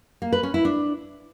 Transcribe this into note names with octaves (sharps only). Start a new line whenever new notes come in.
A#3
B4
C#4
E4
D4